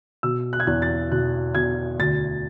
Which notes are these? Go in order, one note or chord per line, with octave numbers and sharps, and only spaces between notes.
B2 E6
F#6
G#6
E2 F#6
A6
B2 F#6
B2 G#6
D2 A6